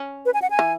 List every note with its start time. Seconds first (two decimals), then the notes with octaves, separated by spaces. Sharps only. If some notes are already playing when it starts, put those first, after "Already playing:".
Already playing: C#4
0.26 B4
0.34 G#5
0.42 F#5
0.50 G#5
0.59 E3